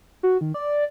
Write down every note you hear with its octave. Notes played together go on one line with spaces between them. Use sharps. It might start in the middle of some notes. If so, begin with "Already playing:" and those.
F#4
D#3
D5